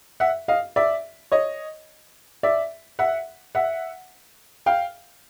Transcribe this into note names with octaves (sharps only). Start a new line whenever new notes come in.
E5 F#5
D#5 F5
D5 E5
C#5 D#5
D5 E5
E5 F#5
E5 F#5
F5 G5